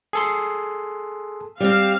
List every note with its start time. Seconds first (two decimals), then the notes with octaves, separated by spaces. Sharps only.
0.13 G#4 A4 C6
1.60 G3 C4 F5